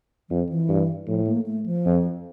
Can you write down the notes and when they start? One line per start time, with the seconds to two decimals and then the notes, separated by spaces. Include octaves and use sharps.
0.29 F2 F3
0.49 E3
0.69 G2
1.07 A2 F3
1.27 A#3
1.46 A3
1.66 F3
1.86 F2